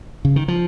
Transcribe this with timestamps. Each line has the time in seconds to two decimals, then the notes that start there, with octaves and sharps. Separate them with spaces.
0.25 C#3
0.36 D#3
0.48 F3